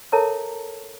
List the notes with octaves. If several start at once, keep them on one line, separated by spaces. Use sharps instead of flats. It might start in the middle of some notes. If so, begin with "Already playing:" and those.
A4 A#4 C#5 E5 A5 A#5